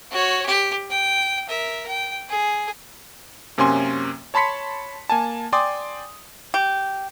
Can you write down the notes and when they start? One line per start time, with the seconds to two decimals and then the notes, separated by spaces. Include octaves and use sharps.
0.11 F#4 C#5
0.46 G4
0.90 G5
1.48 A#4 E5
1.88 G5
2.29 G#4
3.58 F#2 C3 A#3 C#4 G#5 C6
4.34 C#5 A5 B5 C6 B6 C#7
5.10 A#3 G#5 A5
5.53 D5 G5 G#5 C6 D6 D#6
6.54 G4